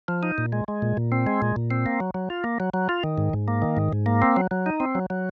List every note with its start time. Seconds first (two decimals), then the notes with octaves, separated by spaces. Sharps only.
0.08 F3
0.23 D#4
0.38 A#2
0.52 G#3
0.68 G#3
0.82 A#2
0.97 A#2
1.12 C4
1.27 G#3
1.42 A#2
1.56 A#2
1.71 C4
1.86 A#3
2.00 F#3
2.14 F#3
2.30 F4
2.44 A#3
2.60 F#3
2.74 F#3
2.89 F4
3.03 D#3
3.18 G#2
3.33 G#2
3.48 A#3
3.62 D#3
3.77 G#2
3.93 G#2
4.06 A#3
4.22 C4
4.36 F#3
4.51 F#3
4.66 D#4
4.80 C4
4.95 F#3
5.10 F#3